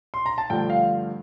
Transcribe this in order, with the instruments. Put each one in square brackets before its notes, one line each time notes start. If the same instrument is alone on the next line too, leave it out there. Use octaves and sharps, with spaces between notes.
[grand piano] C6
A#5
A5
G2 D3 F3 A3 G5
F5